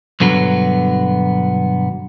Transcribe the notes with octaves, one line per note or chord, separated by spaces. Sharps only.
B1 G2 D3 F#3 B3